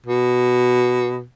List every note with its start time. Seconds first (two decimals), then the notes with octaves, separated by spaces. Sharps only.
0.07 B2